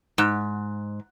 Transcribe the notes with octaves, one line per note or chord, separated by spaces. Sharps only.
G#2